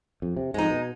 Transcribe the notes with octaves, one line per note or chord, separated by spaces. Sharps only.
F2
C3
F2 G#2 G#3 D#4
B2